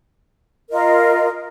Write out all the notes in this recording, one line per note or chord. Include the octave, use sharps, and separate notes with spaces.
F4 A#4 D#5